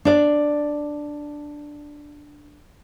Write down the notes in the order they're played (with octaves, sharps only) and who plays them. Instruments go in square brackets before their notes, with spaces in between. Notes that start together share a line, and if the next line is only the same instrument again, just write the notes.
[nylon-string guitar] D4 D5